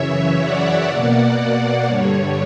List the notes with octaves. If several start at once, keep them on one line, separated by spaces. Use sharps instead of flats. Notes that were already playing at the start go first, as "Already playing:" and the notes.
Already playing: F#2 C#3 E3 C#5 E5
D5 F#5
B2 A#3 D5 F#5
G2 D3 G3 C#5